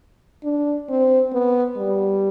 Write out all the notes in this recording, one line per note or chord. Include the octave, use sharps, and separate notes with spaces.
D4
C4
B3
G3